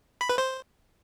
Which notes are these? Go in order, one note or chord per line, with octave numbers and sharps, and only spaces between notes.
B5
B4
C5